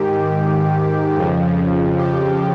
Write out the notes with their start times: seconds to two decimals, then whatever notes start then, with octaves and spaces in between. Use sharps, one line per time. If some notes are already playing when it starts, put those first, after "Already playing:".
Already playing: G#2 D#3 G4
1.17 F2 C#3 F3
1.98 G4